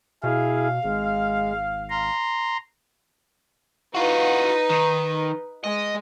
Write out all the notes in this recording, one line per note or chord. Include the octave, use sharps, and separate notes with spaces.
B2 E4 G#4 F5
G#1 G#3
A#5 C6
D#4 F4 F#4 B4
D#3
G#3 D#5